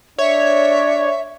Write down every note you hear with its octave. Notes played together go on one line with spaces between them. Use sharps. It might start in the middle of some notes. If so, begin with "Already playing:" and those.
D4 C#5 E5